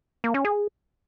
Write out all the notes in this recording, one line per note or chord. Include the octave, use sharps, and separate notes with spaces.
A#3
C#4
G#4